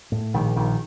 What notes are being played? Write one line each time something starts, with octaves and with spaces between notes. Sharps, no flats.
A2
A#1 D#3
A#1 D#3